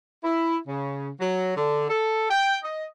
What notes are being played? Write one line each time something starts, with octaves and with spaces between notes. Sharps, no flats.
E4
C#3
F#3
D3
A4
G5
D#5